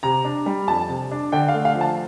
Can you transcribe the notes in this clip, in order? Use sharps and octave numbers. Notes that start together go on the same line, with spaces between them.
C3 A#5
D4
G3
F2 A5
C3
D4
D3 G5
F5
A3
F5
F3
A5